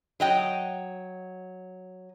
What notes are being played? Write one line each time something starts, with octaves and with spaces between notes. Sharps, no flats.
F#3 D#5 G5